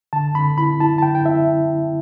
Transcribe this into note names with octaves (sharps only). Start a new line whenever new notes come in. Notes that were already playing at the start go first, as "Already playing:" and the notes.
D3 A5
D3 B5
E4 B5
E4 A5
A5
D3 G5
G5
E4 E5